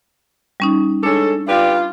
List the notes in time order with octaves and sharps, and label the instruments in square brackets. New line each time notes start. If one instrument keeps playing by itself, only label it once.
[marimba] G3 C#4 D#4
[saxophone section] G#3 C#4 A4 [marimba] D4
[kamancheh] F4 [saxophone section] G4 B4 D5